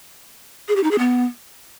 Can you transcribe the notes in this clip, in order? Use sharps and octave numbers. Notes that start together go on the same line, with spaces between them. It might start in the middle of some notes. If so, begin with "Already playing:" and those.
G#4
G4
D#4
G#4
B3